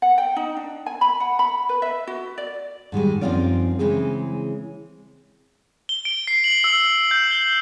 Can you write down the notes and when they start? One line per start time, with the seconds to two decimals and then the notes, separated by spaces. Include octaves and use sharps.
0.02 F#5
0.18 G5
0.36 D#4
0.57 D4
0.86 G#5
1.01 B5
1.20 F#5
1.39 B5
1.69 B4
1.82 E5
2.07 F#4
2.38 D5
2.92 G#2 D#3 G3 G#3
3.21 F#2 F3 C4 D#4 F4 D5
3.79 C#3 E3 G#3 C4 E4 G#4
5.89 G7
6.05 D7
6.27 C7
6.44 F#7
6.64 E6
7.11 G6
7.31 G7